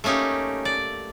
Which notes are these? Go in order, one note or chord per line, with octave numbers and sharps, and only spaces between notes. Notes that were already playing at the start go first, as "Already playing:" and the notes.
A3 A#3 C#4 D#4 G4
D5